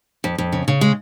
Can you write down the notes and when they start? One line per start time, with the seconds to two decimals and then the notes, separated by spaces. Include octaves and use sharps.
0.24 F2
0.38 F2
0.53 C#3
0.68 C#3
0.81 G#3